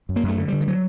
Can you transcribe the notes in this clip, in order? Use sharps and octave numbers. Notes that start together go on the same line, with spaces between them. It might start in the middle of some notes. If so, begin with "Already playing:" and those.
F#2
A#3
F#2 A3
D3
D3 G3
D#3
F#3